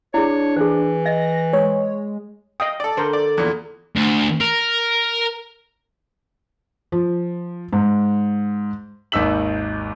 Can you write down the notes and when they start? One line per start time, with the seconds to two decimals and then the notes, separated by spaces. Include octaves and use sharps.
0.14 D4 E4 G#4 C#5
0.56 E3 G#4 C5
1.06 D#5 A#6
1.53 G#3 C#5
2.60 D#5 F5 G5 D#6
2.80 A4 D5
2.97 D3 A#4 C5
3.13 D5
3.38 E2 A#2
3.96 D2
4.41 A#4
6.92 F3
7.73 G#2
9.12 G#1 D#2 D#4 E6 B6 F#7